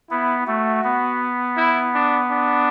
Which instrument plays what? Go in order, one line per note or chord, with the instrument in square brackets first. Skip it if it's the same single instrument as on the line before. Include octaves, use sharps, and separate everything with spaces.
[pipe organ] B3 [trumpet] E4
[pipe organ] A3 [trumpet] F#4
[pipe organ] B3
[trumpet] E4
D4
D4